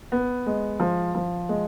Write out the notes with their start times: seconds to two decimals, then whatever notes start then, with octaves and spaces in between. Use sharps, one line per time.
0.12 B3
0.46 G#3
0.80 F3
1.15 F3
1.49 G#3